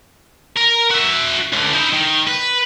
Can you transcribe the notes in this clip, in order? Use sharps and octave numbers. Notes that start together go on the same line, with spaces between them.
A#4
F#4 E5
C#2 D3
D#4 E4
D#3
B4